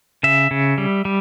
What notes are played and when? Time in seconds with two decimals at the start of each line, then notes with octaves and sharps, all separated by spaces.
0.23 C#3 E5
0.51 C#3
0.78 G3
1.05 G3